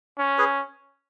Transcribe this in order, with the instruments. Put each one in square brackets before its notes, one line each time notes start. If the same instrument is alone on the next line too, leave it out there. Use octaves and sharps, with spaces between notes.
[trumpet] C#4
[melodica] G#4 B4